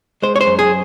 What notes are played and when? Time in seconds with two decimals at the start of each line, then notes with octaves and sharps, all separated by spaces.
0.22 G#3 C5
0.36 C#5
0.41 C5
0.46 F#2
0.59 G#4